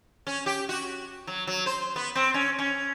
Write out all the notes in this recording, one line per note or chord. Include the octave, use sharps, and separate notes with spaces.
C#4
G4
F#4
F#3
F#3
C5
B3
C4
C#4
C#4